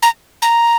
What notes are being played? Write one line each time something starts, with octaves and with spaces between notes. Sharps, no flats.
A#5
A#5